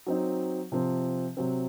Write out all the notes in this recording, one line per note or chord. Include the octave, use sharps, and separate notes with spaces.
F#3 C4 D#4
C3 F3 C4
C3 F#3 C4